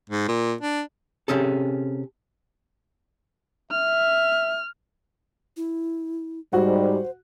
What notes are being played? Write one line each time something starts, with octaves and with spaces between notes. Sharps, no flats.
G#2
A#2
D4
C3 C#4 G#4 A4
E5 F6
E4
G#2 G3 F#4 C5 F#5